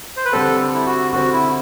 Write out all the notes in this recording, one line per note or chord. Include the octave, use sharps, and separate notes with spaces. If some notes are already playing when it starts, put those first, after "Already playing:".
C5
B4
D3 G3 C4 A4
E4
F#4
D3 G3 C4 F#4
E4